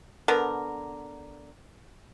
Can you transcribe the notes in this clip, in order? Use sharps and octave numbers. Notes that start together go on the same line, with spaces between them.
D3 B3 A#4